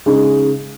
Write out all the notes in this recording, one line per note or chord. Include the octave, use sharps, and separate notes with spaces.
C#3 G#3 D#4